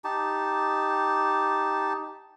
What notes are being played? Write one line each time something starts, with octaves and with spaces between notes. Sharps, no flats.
D#4 G4 A5